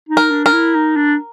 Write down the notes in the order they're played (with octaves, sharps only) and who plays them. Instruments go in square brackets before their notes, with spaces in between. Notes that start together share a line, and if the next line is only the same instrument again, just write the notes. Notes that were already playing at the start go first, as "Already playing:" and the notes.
[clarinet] D#4
[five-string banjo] A#4
[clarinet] D4
[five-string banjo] A#4
[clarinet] E4
D#4
D4